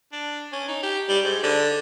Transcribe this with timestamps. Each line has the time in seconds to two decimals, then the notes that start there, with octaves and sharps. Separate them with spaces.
0.12 D4
0.52 C#4
0.68 D#4
0.83 G4
1.09 G3
1.24 G#2
1.43 D3